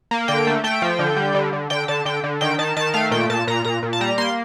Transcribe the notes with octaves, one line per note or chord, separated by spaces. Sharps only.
A#3
D3 G5
A3
A3 G5
F3
D3
G3
D3
D3
D3 G5
D3 A5
D3 G5
D3
D#3 G5
D#3 A5
D#3 A5
A3 F5
A#2 G5
A#2 A5
A#2 A#5
A#2 A#5
A#2
A5
G3 A#5
A#3 C6